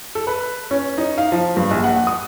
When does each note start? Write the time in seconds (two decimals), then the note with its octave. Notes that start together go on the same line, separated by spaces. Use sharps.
0.15 A4
0.27 B4
0.71 C#4
0.98 D#4
1.18 F5
1.32 F3
1.57 G2
1.71 A#1
1.84 F#5
2.07 D#6